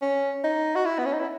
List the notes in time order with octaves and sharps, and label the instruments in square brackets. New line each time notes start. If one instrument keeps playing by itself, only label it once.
[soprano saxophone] C#4
D#4
F#4
E4
B3
C#4
D#4
E4